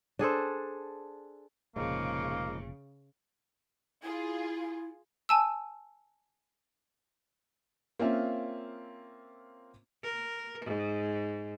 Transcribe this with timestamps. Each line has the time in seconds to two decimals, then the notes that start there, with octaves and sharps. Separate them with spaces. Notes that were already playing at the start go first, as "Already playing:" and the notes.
0.19 D4 G#4 A4 C5
1.76 F1 A#2 C#3 F3 G#3 A#3 D#4
4.03 E4 F4 G#4
5.29 G#5 A5 E6
7.99 A#3 C4 C#4 F4 E5
10.03 A#4
10.65 G#2